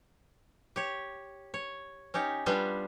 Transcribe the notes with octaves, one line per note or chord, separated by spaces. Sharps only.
G4 C#5
C#5
C#4 D#4 G4 C#5
G3 B3 D4 F4 G4